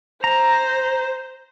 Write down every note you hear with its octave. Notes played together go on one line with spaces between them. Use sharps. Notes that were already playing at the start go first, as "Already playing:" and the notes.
C5 A#5